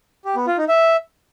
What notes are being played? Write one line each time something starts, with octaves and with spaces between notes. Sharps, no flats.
G4
B3
F4
D#4
E5